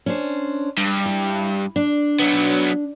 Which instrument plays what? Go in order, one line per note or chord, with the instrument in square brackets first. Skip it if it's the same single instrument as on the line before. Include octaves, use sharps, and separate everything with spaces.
[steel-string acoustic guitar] C#4 D4 C5
[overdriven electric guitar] G2
[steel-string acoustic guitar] E4
D4
[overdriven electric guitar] F#3 B3